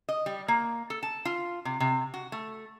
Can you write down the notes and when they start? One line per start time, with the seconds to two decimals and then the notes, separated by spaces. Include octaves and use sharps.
0.09 D#5
0.26 G3
0.48 A#3
0.90 A4
1.03 A5
1.25 F4
1.65 C3
1.80 C3
2.14 F#4
2.32 A3